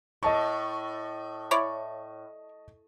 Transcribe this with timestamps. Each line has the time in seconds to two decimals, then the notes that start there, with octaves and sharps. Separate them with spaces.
0.23 A2 D#5 A5 C#6
1.51 E4 C#5 D5